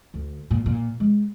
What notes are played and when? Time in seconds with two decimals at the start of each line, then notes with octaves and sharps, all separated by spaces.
0.14 D2
0.51 A#2
0.66 A#2
1.00 G#3